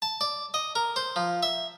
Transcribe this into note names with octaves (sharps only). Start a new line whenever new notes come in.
A5
D5
D#5
A#4
C5
F3
E5